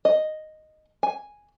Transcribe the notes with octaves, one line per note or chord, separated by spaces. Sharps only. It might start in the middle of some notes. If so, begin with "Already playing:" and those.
D#5
G#5